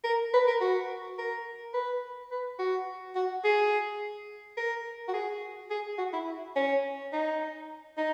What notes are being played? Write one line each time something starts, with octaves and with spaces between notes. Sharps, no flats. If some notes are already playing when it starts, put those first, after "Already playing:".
A#4
B4
A#4
F#4
A#4
B4
B4
F#4
F#4
G#4
A#4
F#4
G#4
G#4
F#4
E4
C#4
D#4
D#4